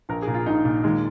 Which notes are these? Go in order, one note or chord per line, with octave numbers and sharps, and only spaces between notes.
A#1 A#4
G#4
A#2
F4
A#1 D#4
A#2
D#2 G#3